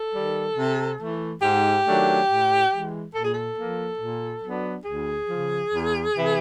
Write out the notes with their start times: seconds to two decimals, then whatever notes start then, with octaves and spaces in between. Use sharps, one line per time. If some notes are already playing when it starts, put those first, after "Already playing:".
Already playing: A4
0.14 D#3 G3
0.57 C3
1.00 E3 A3
1.42 G#2 G4
1.85 D#3 F#3 A3 D4
2.28 A2
2.71 E3 G#3
3.14 A#2 A4
3.23 G#4
3.33 A4
3.57 F3 A#3
3.99 A#2
4.43 F#3 B3 D4
4.85 D2 G#4
5.28 C#3 F3
5.71 E2
6.13 C3 E3